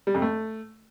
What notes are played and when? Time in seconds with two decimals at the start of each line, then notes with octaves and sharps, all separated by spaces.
0.07 G3
0.14 F2
0.22 A3